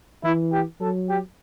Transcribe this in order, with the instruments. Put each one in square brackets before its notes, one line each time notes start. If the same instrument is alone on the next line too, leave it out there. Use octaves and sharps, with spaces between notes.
[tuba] E3 [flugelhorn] E4
[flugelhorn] G4
[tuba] F#3 [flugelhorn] A4
[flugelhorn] G4